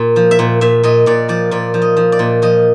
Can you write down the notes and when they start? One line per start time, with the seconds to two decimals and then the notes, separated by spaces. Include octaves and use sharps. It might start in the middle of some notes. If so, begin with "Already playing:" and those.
Already playing: A#2
0.16 F3
0.31 E5
0.39 A#2
0.61 A#2 E5
0.83 A#2 D#5
1.06 A#2 D5
1.29 F3 D5
1.51 A#2 D5
1.74 F3
1.82 D#5
1.97 F3
2.12 D5
2.19 A#2
2.42 F3 D#5